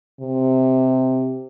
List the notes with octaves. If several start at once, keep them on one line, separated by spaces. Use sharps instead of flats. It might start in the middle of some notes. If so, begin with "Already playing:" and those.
C3